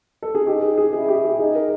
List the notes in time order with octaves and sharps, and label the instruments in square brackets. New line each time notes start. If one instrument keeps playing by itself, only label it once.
[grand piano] A4
G#4
[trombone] D#4 [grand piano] G4
[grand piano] G#4
G#4
[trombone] E4 [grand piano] G#4
[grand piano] G4
G#4
[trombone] D#4 [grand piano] G#4
[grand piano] A#4